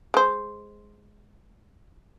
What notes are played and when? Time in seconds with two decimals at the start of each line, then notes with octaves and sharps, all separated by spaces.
0.14 G#3 C5